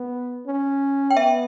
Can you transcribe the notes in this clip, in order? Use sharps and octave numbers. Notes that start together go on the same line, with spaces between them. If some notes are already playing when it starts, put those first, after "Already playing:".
Already playing: B3
C#4
G5
B3 E5